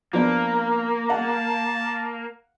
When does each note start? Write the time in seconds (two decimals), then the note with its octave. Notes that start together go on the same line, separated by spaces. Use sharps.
0.13 F3 A#3 B3 D4
1.09 F5 F#5 A5